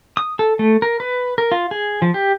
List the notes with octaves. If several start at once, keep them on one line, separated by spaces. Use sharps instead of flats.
D#6
A4
A3
A#4
B4
A#4
F4
G#4
F3
G4